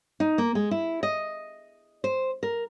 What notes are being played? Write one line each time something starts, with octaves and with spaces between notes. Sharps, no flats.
D#4
A#3
G#3
E4
D#5
C5
A#4